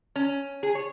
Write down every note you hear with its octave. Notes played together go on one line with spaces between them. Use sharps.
C#4
G#4
C#5